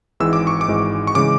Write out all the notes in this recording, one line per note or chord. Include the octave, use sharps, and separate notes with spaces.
G#1 G#2 E3 G#3 E6
D6
C#6
D6
G#1 G#2 E3 G#3
C#6
C#3 E3 G#3 D6